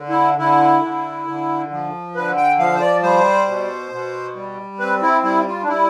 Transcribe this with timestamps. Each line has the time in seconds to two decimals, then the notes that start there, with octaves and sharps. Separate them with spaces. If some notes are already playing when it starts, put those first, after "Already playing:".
Already playing: D3
0.09 E4
0.38 D3 E4
0.83 D3
1.27 D3
1.71 F3
2.15 D3 B4
2.37 G5
2.59 F3 F5
2.75 C5
2.81 D5
3.03 G3 C5
3.47 B2
3.92 B2
4.35 G3
4.79 C4 B4
5.02 E4
5.24 G3 E4
5.46 F4
5.63 D4
5.68 G3 E4